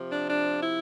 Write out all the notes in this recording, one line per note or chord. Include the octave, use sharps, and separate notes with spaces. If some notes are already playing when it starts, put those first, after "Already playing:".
Already playing: C3 F3
D4
D4
E4